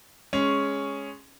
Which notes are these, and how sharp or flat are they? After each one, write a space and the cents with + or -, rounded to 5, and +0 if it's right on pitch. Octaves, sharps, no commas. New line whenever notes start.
G#3 +0 C#4 +0 G#4 +0